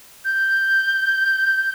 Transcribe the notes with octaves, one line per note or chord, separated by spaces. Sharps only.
G6